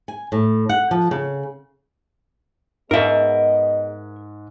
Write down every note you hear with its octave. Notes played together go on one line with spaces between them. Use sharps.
G#5
A2
F#5
F3
C#3
G#2 B3 G#4 A#4 D#5 E5 B6